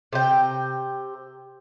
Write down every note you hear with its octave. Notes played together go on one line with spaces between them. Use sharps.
C3 G5